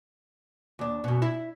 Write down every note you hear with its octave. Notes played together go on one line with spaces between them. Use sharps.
D#2 D4
F#2 B2
E4